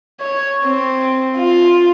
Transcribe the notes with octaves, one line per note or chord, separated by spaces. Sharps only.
C#5
C4
F4